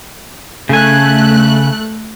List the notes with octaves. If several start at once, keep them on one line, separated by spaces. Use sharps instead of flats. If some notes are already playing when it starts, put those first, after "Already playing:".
C#3 A3 G#5 F#6